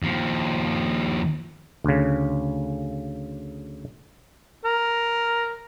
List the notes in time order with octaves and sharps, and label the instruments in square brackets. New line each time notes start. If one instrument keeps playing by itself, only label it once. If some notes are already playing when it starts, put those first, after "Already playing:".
[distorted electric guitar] D#2 F3
[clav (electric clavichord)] D2 C#3
[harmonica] A#4